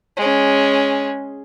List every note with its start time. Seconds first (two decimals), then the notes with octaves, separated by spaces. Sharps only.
0.17 G#3 C#4